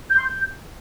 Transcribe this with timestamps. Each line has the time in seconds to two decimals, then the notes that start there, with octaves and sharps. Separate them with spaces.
0.09 G6
0.16 C6
0.24 G6